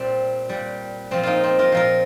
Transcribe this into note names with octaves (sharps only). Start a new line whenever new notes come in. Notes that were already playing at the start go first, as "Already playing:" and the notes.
Already playing: A#2 G3 C4
A#2 G3
A#2 F3 C4
A#3 D#4 F4
C4
F4 A#4
A#2 F3 F4 A#4